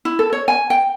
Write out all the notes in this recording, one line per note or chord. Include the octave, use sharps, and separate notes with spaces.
E4
A4
C#5
G#5
G5